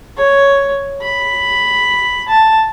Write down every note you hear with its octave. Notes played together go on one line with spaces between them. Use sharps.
C#5
B5
A5